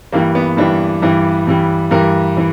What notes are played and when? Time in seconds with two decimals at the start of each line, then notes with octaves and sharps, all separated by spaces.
0.13 G2 E3 G3 A#3
0.35 B3
0.57 G2 E3 G3 D4
1.02 G2 E3 G3
1.47 G2 E3 G3
1.91 G2 E3 G3 A#4
2.37 E3